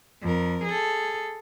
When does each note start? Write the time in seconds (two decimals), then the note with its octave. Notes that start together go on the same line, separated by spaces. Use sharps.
0.24 F2 A#4
0.67 G#4 A4